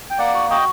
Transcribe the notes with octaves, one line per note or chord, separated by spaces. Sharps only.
G5
A#3 D5 F#5
F#4
F#4 D#5 G5